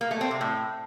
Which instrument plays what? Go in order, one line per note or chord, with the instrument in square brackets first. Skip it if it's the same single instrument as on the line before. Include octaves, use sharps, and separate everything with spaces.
[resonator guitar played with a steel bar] A#3
A3
C4
C3
A2